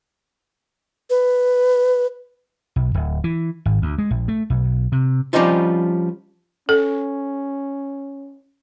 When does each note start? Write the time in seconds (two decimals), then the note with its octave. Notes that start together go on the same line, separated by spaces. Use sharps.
1.10 B4
2.76 B1
2.94 D1
3.24 E3
3.66 G#1
3.82 D2
3.98 G#3
4.11 A#1
4.28 A3
4.50 B1
4.92 C3
5.33 F3 G3 C4 C#4 D#4 F4
6.69 C#4 A4